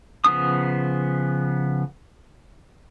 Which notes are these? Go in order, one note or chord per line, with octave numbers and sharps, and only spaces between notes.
C#3 F3 B3 D4 D#6